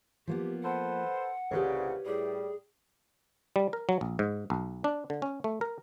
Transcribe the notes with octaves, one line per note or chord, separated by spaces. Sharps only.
F3 A#3 B3 G4
A4 B4 C5 F#5
C2 A#2 C#3 G4 B4 C#5
A2 G3 G#4
G3
A#4
F#3
A#1
G#2
B1
D4
D3
C#4
A3
A#4